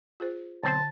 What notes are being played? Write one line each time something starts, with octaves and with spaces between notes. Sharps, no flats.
F4 G#4 C5
B1 D3 C4 C5 A5